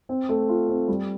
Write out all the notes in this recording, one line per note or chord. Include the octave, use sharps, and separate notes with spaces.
C4
A3
F4
C4
G3